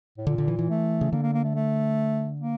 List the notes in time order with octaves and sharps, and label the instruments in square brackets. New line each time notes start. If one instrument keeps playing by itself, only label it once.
[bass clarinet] A2
[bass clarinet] A#2 [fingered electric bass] D3
[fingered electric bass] D3
E3
E3
[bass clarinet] A3
[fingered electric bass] C#3
[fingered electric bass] D3 [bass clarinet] A#3
[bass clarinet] A#3
A#3
A3
A3
A#3